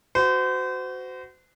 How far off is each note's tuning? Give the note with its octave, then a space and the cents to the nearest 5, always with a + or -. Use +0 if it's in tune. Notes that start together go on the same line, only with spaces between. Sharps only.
F#4 +5 C5 -35